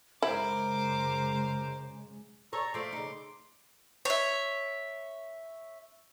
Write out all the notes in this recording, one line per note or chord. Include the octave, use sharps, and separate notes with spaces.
F#2 C#3 G#3 E4 A#4 C5 D6
A4 C#5 A#5
F3 A3 C6 D6
C#3 D#4
C#5 E5